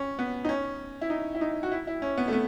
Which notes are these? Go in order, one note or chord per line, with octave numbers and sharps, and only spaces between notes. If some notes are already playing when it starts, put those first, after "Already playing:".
Already playing: C#4
B3
D#4
C#4
E4
D#4
E4
D#4
F#4
E4
E4
C#4
B3
A3
B3